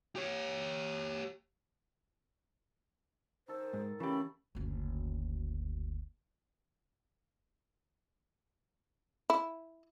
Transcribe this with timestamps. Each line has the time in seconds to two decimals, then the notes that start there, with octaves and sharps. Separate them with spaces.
0.16 G4 C#5
3.48 D#3 A4 C5
3.74 G#2
4.00 C#3 E3 A3 C#4 G4 B5
4.55 F#1 D2
9.30 E4